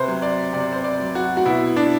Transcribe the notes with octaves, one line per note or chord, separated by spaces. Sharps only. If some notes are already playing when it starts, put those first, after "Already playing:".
Already playing: C3 B4 C5
F#3
D5
C3 D5
C5
D5
F#3
F#4
F#4
B2 E4
D4